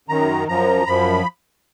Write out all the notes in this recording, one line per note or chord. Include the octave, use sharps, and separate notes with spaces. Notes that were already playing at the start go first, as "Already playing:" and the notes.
F#2 D#3 A#5
F#2 F3 A#5
F#2 F3 B5